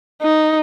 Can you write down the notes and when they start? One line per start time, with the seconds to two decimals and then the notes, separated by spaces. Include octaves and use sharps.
0.22 D#4